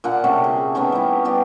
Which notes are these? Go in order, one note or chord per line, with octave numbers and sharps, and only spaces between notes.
A#2 D3 F#5
C3 A3 C#4
G#4
D#3 A3 B3 C#4
G3 E4
B3 G4 D#5